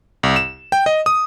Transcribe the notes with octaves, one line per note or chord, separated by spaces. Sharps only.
C2
E7
G5
D#5
D#6